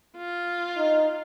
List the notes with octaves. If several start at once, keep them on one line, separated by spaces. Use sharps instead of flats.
F4
D#4